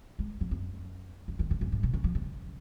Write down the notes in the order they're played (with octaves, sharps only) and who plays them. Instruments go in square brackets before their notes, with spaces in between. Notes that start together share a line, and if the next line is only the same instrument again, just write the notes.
[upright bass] G#3
F3
F#2
F#2
D#3
C#3
F#2
G#2
B2
C#3
F3
C#3